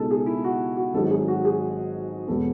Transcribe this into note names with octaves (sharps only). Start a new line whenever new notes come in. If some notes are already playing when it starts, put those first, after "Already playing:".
Already playing: C#2 B2 G#3 D#4 G#4 A4
G#4
E4
F#4
F#4
G#1 G#2 F#3 A4
G#4
F#4
G#4
E1 B2 G#3 B3 A4